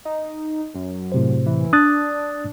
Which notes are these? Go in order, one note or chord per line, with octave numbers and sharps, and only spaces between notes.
D#4
F#2
A2 C3 C5
E3
D4 D#6 F#6 A6